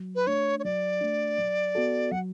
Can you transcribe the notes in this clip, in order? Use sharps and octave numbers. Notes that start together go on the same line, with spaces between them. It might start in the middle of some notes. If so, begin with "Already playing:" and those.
Already playing: F#3
B4
A3 D4 C#5
C#5
F#3 D5
A3 D4
F#3
B3 F#4 A4
F#3 F#5